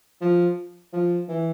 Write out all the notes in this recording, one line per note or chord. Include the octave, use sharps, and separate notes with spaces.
F3
F3
E3